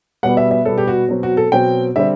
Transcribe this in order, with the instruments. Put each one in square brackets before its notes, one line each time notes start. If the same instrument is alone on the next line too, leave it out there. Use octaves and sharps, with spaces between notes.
[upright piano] B2 G3 B3 F#5
E5
E5
B2 G3 B3 A4
G4
F#4
B2 F#3 C4
F#4
A4
B2 F#3 C4 G5
D3 G3 C4 E5